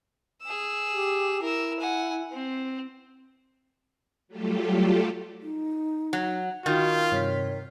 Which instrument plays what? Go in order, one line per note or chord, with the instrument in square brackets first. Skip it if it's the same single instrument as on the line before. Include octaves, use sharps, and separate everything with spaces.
[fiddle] G#4 E6
[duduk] G4
[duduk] E4 [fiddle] A#4 E6
[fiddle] F#5 G#5
C4
[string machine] F#3 G3 A3 F4 G4 A4
[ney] D#4
[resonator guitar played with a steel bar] F#3
[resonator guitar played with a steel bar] D#3 [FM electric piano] D#4 [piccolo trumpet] F4 [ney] F#4
[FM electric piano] G2 C3 B6 [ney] C#5